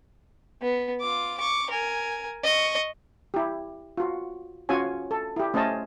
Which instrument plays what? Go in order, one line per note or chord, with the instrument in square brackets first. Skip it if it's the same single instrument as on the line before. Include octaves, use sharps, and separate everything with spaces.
[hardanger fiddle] B3
F4 D6
C#6 D6
A#4 G#5
D#5 C#6
[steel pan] E4 G4
F4 F#4
C#4 F4 F#4 C#5 G#5
A4
E4 G4
A3 C#4 C5 D#5 A5